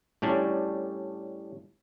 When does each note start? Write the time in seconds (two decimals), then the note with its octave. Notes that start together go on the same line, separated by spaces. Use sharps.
0.22 A2 G3 C#4 D4